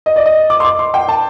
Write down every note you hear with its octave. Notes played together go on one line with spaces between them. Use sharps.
D#5
D5
D#5
D6
C6
D6
C6
G5
A5